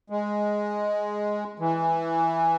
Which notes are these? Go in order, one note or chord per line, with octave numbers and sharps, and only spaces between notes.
G#3
E3